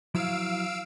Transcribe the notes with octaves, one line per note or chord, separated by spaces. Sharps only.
F3 F#3 E4 F5 E6 D7